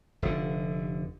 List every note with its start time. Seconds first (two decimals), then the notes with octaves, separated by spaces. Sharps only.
0.22 F1 D3